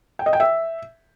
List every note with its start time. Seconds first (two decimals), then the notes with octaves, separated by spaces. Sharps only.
0.19 G5
0.26 D#5
0.33 G5
0.40 E5